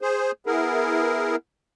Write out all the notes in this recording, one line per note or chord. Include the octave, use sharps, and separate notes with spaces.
G#4 C5
B3 E4 G#4 A#4